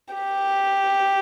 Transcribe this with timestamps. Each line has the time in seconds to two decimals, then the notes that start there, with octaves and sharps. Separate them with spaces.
0.14 G4